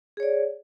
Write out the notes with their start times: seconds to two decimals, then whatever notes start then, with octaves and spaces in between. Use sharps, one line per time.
0.17 G#4
0.20 C#5
0.23 D5